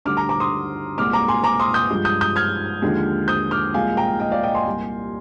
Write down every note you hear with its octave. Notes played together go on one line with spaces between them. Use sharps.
D2 D3 G3 D6 F6
A#5 D6
A#5 D6
C6 D#6
C2 A#2 G#3 D6 F6
A#5 D6
G#5 C6
A#5 D6
C6 D#6
D#6 G6
G2 F3 G#3
D#6 G6
D#6 G6
F6 G#6
D#2 D3 F3 G#3
D#6 G6
D6 F6
C2 A#2 F3 G#3 F5 G#5
G5 A#5
D#5 G5
D5 F5
D#5 G5
G#5 C6
C2 A#2 G3